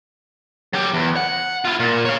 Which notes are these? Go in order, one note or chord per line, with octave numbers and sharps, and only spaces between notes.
F#3 G4
E2
F#5
E4 F4
A#2
C#5 F5